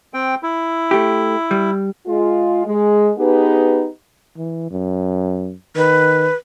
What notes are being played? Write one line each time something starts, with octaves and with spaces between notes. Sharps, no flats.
C4 G5
E4
A3 G4
G3
G#3 F4
G#3
B3 D#4 G4 G#4 B4
E3
F#2
D#3 B4